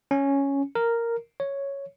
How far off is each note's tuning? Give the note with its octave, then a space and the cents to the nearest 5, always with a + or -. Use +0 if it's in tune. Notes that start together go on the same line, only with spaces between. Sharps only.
C#4 +0
A#4 -5
C#5 +0